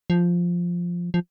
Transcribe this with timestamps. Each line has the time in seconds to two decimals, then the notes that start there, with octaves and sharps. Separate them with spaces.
0.10 F3
1.14 F3